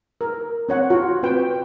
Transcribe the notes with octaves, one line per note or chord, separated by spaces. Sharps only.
A#4
C4 C#5 F#5
F4 F#4
C4 B4 G5